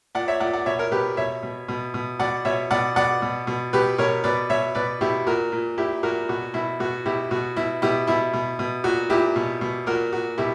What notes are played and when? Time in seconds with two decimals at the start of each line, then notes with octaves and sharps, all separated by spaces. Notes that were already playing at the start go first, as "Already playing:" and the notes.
0.15 A#2 D5 F#5
0.28 C#5 E5
0.40 A#2 D5 F#5
0.53 D5 F#5
0.66 B2 C#5 E5
0.78 A#4 C#5
0.91 B2 G4 B4
1.17 B2 C#5 E5
1.43 B2
1.68 B2
1.94 B2
2.19 B2 D5 F#5
2.45 B2 C#5 E5
2.71 B2 D5 F#5
2.96 B2 D5 F#5
3.22 B2
3.47 B2
3.73 B2 G4 B4
3.98 B2 A#4 C#5
4.24 B2 B4 D5
4.50 B2 C#5 E5
4.75 B2 B4 D5
5.01 B2 E4 G4
5.27 A#2 F#4 A#4
5.52 A#2
5.78 A#2 E4 G4
6.03 A#2 F#4 A#4
6.29 B2 F#4
6.54 B2 E4
6.80 B2 F#4
7.05 B2 E4 G4
7.31 B2 F#4
7.56 B2 E4
7.82 B2 E4 G4
8.07 B2 E4
8.33 B2
8.59 B2
8.84 A#2 F#4
9.10 A#2 E4 G4
9.36 B2
9.61 B2
9.86 A#2 F#4 A#4
10.13 A#2 F#4
10.38 B2 E4 G4